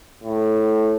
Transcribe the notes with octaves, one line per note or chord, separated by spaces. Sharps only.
A2